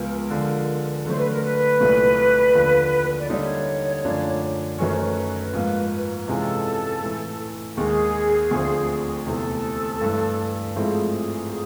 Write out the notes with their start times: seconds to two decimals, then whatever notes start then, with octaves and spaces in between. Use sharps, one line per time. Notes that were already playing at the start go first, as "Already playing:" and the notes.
Already playing: C#2 C#3 F3 G#3 B3 A#4
0.30 D3 F3 G#3
1.06 D3 F#3 A3 C5
1.18 B4
1.30 A#4
1.43 B4
1.80 C2 A#2 F#3 A3
2.55 D#2 D3 F3
3.20 D5
3.29 D3 G3 A#3 D#4 C#5
4.05 F#2 D3 F3 A3 D4
4.78 F#2 D#3 F#3 A3 C#4 B4
4.90 C5
5.02 B4
5.53 G#2 F3 A#3
6.28 C3 E3 G#3 C#4 F4 A4
7.02 A2 E3 A3
7.77 D#2 D#3 G#3 G#4
8.51 D2 D3 F3 A3 C4
9.26 E2 C3 E3 A3 C4 A4
10.01 G2 E3 A3
10.76 G#2 F3 A3 C4 E4 G#4